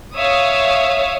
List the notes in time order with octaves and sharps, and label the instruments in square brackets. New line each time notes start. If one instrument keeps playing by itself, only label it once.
[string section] C#5 E5 F5 D#6